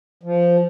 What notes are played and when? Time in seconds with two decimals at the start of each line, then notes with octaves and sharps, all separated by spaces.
0.23 F3